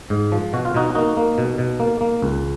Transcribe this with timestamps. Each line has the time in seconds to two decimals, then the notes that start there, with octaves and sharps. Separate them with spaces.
0.10 G#2
0.32 F3
0.53 B2 F#4
0.65 F4
0.74 B2 D#4 F#4
0.95 A#3 D#4 F#4
1.17 A#3
1.38 B2
1.58 B2
1.80 A#3
2.01 A#3
2.22 C#2